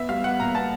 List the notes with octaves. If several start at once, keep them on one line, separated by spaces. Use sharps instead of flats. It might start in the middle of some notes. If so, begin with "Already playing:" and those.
Already playing: B3 E5
G3 F5
B3 F#5
A#2 A#5
B3 A5